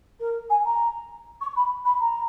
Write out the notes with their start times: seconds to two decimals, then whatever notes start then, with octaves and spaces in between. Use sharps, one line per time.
0.19 A#4
0.50 G#5
0.65 A#5
1.41 C#6
1.56 B5
1.85 B5
2.00 A#5